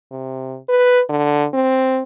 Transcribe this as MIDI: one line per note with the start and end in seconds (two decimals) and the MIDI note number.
0.11 0.57 48
0.69 1.01 71
1.09 1.46 50
1.53 2.03 60